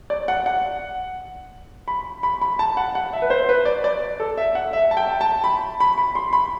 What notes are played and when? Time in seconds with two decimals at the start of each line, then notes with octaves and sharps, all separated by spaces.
0.10 D5
0.28 F#5
0.46 F#5
1.88 B5
2.23 B5
2.41 B5
2.59 A5
2.77 F#5
2.95 F#5
3.13 E5
3.22 B4
3.30 C5
3.49 B4
3.65 D5
3.84 D5
4.20 A4
4.37 E5
4.55 F#5
4.73 E5
4.91 A5
4.97 G5
5.21 A5
5.44 B5
5.80 B5
5.98 B5
6.15 C6
6.33 B5